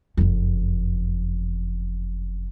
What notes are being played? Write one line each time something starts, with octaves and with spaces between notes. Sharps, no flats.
F#1 F2